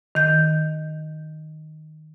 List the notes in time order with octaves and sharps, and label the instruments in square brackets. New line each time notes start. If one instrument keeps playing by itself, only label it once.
[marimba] D#3 G6